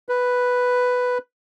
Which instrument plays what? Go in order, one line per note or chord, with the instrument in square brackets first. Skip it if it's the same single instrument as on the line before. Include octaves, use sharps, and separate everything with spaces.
[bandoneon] B4